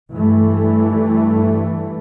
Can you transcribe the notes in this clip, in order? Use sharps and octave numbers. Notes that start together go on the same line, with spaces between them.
G2 E3 A3